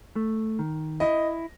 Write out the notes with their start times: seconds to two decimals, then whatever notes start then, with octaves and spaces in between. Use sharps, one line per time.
0.16 A3
0.59 D#3
1.00 E4 D#5